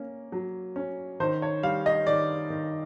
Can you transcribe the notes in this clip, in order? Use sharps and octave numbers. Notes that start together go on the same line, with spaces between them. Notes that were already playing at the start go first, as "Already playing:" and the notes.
Already playing: A#3 C#4
F#3
C#4
D#3 C5
C#5
G3 F5
D#5
D#3 D5
D#3